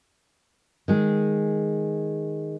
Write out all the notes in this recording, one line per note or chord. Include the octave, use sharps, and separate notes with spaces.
D#3 G#3 G#4